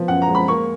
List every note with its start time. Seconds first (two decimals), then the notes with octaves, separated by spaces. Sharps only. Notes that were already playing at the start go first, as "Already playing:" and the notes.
Already playing: F3 B3
0.08 F#2 F#5
0.22 A#5
0.28 G#3
0.35 B5
0.48 A#3 C#6